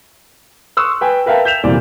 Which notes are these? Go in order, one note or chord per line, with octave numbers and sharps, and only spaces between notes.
C6 C#6 D#6 E6 F#6
B4 G5 G#5
A#4 B4 E5 F5 G5 A5
G6 B6 E7 F7
F1 A#2 E3 G3 C4 D5